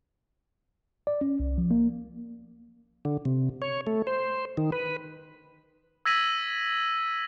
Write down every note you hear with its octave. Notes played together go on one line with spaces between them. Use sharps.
D5
C#4
C2
F3
A#3
D3
C3
C#5
A3
C5
D#3
B4
E6 G#6 A#6 B6 D#7 F#7